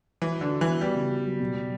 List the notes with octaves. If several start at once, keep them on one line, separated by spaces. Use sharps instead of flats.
E3 F#4
D3 F#4
F#4
E3 B3
G3 B3
C#3
F#4
F#3
B2
F#3